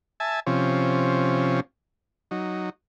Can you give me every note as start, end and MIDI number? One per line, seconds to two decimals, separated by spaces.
0.20 0.40 76
0.20 0.40 80
0.20 0.40 81
0.47 1.60 48
0.47 1.60 53
0.47 1.60 61
2.31 2.70 54
2.31 2.70 63